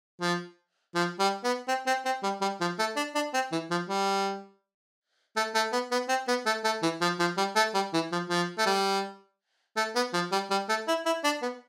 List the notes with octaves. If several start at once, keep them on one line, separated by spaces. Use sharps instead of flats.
F3
F3
G3
B3
C4
C4
C4
G3
G3
F3
A3
D4
D4
C4
E3
F3
G3
A3
A3
B3
B3
C4
B3
A3
A3
E3
F3
F3
G3
A3
G3
E3
F3
F3
A3
G3
A3
B3
F3
G3
G3
A3
E4
E4
D4
B3